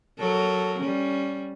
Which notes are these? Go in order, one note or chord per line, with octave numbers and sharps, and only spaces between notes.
F#3 A4 A#4
G3 C#4